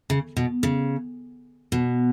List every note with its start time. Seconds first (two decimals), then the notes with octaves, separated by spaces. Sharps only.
0.10 C#3
0.37 B2
0.63 C#3
1.72 B2